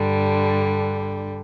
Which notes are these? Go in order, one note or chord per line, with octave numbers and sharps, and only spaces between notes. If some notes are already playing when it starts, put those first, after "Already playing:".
Already playing: G2 D3 G3